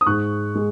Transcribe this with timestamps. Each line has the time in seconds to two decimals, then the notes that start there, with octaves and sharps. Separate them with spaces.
0.01 D#6
0.06 G#2 G#3 C#6 F#6
0.55 G#3